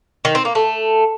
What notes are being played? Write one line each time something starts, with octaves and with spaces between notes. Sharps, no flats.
D#3
C4
A#3
A3